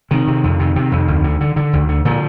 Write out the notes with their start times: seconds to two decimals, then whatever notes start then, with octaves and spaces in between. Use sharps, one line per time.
0.11 C3 D#3
0.28 C3
0.43 F2
0.59 C3
0.76 C3
0.92 F2
1.08 D2
1.24 D3
1.41 D3
1.56 D3
1.73 D2
1.89 D3
2.05 A#2 D3 F3